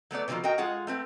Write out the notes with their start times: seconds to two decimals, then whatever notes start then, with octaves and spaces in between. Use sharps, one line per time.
0.11 F#3 A3 B3 D5
0.28 B2 D3 F3 F#3 A#3
0.44 F#4 A#4 D#5 G5
0.58 G#3 F4 G#4 F#5
0.87 A3 C4 B4